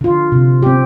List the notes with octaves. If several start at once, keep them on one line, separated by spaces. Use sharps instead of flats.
D3 F4
C3
C4 G4